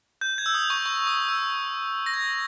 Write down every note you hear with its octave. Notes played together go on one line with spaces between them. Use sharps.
G6
G#6
E6
D#6
C#6
C#6
D#6
E6
A#6
G#6